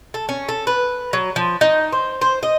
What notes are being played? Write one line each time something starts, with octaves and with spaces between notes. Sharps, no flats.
A4
C#4
A4
B4
F#3
F3
D#4
C5
C5
D#5